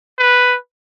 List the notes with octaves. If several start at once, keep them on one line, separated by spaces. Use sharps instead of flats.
B4